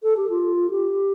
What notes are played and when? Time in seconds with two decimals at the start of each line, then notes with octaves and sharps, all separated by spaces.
0.03 A4
0.17 G4
0.30 F4
0.70 G4